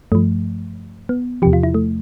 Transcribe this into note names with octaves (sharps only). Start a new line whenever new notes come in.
G2 F3 A3
B3
E2 C3 F3 G4
F4
E4
A3